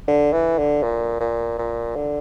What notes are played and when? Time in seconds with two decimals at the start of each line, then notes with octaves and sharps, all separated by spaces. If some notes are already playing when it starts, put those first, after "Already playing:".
0.08 D3
0.33 E3
0.58 D3
0.83 A#2
1.20 A#2
1.58 A#2
1.96 D3